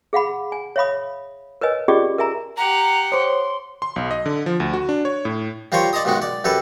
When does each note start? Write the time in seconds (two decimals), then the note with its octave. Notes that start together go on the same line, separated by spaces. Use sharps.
0.13 G#4 F5 F#5 B5
0.52 G#5
0.76 C#5 E5 F5 B5 D#6
1.61 A#4 B4 C#5 D#5 G#5
1.88 C#4 F4 G4 G#4 D5 D#5
2.18 A#4 E5 G#5 A#5
2.57 G4 F#5 A#5
3.12 C5 C#5 C6
3.82 C6
3.96 B1
4.11 D#5
4.26 D3
4.46 F3
4.60 D2
4.73 F#4
4.89 D4
5.05 C#5
5.25 A2
5.72 G3 F4 A#4 C5 C#5
5.93 D5 D#5 A5 A#5 D#6
6.05 B1 G#2 D#3 G#3 F#4
6.22 D5
6.44 F#2 G4 A4 B4